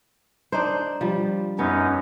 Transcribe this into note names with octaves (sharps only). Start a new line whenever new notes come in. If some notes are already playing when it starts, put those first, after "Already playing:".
D4 D#4 C5
F3 G3
F#2 B3 C#4 D#4